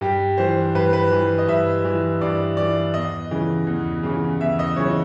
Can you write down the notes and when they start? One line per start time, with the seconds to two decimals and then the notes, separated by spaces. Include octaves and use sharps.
0.01 G2 G4
0.38 E3 C5
0.75 G2 B4
0.93 B4
1.11 E3
1.38 D#5
1.48 G2 E5
1.85 E3
2.21 G2 D5
2.57 E3 D5
2.93 E2 D#5
3.31 C#3 E3
3.67 E2
4.03 C#3 E3
4.40 E2 E5
4.59 D#5
4.76 C#3 E3 C#5